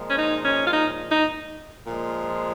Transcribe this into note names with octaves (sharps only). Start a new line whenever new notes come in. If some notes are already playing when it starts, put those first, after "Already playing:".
Already playing: A#2 F3 G#3
C#4
D#4
C#4
F4
D#4
D#4
A#2 F3 G#3